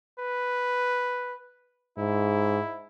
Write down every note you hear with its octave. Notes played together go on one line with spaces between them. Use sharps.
B4
G#2 E4